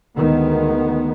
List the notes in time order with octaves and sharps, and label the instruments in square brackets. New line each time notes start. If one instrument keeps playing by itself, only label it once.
[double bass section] D2 D#3 G#3 B3